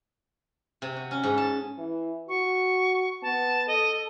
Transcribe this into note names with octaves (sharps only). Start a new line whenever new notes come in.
C3
F#4
C#4
G#2
A5
E3
F#4 C#6
B3 A5
A4 D#5